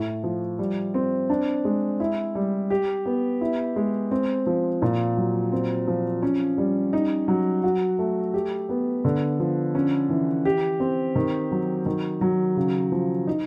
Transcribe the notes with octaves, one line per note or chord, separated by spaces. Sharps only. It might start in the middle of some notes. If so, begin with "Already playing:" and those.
Already playing: A2
F3
G3
C4
D4
G#3
E4
G3
G4
B3
E4
G#3
C4
F3
A#2
F#3
C4
F3
C#4
G3
D#4
F#3
F#4
A3
G4
B3
D3
F3
C#4
E3
G4
C4
D#3
F#3
D#3
F#3
C#3
F3
D#4